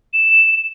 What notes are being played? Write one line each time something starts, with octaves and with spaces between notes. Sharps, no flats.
E7